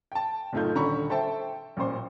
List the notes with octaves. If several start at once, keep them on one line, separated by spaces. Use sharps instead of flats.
G5 A5
F#1 A2 A3 D#4 F4 G6
D#1 D3 C#4 A#5 B5 C#6
A4 C5 E5 G5 A5
A1 A#2 C#4 C5 C6